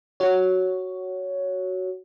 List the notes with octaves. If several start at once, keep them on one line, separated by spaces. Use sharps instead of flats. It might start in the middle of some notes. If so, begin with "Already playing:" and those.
F#4 C#5